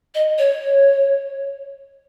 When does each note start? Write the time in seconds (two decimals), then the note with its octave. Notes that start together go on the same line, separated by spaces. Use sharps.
0.15 D#5
0.38 C#5